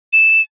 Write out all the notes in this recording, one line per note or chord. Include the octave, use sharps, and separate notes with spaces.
E7